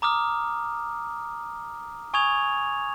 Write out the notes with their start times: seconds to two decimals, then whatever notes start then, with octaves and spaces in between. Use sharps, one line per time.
0.02 A#5 D6 D#6 F6
2.14 G#5 C#6 D#6 G#6 F7